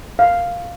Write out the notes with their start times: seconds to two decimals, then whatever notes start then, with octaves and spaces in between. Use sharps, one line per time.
0.19 F5